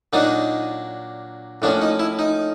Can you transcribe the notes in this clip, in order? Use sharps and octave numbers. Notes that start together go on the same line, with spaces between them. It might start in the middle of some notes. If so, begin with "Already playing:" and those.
A#2 F#3 A#3 D4 D#4
A2 F3 A#3 C#4 D4
D#4
E4
D#4